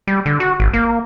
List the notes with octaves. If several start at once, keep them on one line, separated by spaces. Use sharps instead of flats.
G3
D3
F#4
G#1
A#3